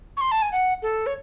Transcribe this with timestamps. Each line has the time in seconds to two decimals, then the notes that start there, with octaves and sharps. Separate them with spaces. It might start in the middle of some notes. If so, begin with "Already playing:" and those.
0.17 C#6
0.21 C6
0.31 A5
0.42 G#5
0.52 F#5
0.82 A4
1.06 C#5